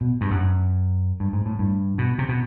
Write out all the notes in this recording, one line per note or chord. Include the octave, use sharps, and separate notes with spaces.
B2
G2
F#2
G2
G#2
A2
G2
B2
C3
B2